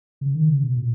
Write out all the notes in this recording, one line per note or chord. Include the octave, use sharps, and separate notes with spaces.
C#3
D#3
C#3
B2
A#2